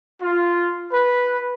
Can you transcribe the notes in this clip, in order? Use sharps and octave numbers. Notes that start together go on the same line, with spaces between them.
F4
B4